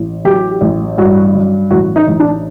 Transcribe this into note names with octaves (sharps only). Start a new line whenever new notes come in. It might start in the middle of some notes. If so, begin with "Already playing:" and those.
Already playing: A1
F#3 G4
A1
G2 F#4
F#3
A1 F#4
D#4
A1
D4